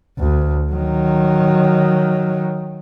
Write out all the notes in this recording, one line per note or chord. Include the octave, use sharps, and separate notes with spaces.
D2
D#3 F#3